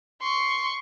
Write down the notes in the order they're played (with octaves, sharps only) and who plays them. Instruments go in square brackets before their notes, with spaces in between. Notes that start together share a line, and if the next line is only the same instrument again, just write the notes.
[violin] C6 C#6